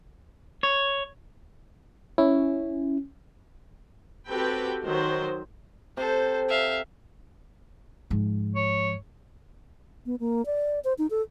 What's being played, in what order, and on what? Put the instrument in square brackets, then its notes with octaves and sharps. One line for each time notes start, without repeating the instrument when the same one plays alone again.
[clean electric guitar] C#5
[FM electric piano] C#4 [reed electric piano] E4
[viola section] C4 F#4 G4 A4 B4 G5
D#3 F#3 C5
[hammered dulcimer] C3 [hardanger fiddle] A4 C5
[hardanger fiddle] E5 F5
[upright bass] G#2 F3
[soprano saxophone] C#5
[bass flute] B3
A#3
D5
C5
D#4
A4